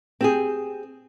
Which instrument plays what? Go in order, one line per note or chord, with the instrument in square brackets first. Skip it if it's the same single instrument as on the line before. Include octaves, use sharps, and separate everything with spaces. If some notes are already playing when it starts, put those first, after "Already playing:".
[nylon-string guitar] C4 G4 G#4